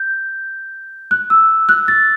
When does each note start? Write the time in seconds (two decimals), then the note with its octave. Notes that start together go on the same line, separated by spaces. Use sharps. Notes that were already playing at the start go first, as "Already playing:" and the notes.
Already playing: G6
1.11 F#6
1.30 E6
1.69 F#6
1.88 A6